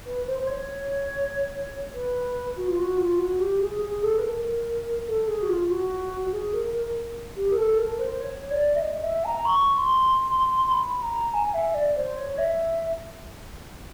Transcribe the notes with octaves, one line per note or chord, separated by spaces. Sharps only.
B4
C5
C5
C#5
B4
F#4
F4
F#4
F4
F#4
G4
G#4
G#4
A4
B4
A#4
A4
G#4
F#4
F4
F#4
G#4
A#4
A#4
G4
A#4
A4
A#4
C5
C5
C#5
D5
E5
D#5
E5
A#5
C#6
C6
C6
B5
A#5
G#5
E5
D5
C5
C#5
E5